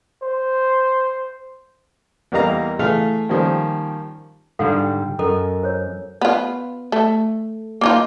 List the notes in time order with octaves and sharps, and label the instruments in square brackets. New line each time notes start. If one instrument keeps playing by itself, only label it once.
[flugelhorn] C5
[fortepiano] E2 G3 A#3 D#5 F5 A#5
E3 A3 G#4 F5 F6
D#3 F3 G3 A#3 C#4
[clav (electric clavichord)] G#2 D3 G3 [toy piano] A4 F5 F#5
[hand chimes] G5
[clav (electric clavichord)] F#2 [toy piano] A4 [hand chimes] A#4 D#5 A#5
[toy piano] C5 C#5
[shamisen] B3 F4
A3
A#3 D#4 F4